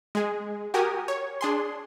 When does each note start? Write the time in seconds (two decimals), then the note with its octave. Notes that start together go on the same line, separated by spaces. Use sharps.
0.15 G#3 G#4
0.74 F#4 G4 A#4 G#5 D#6
1.08 C#5
1.41 D4 G#4 C6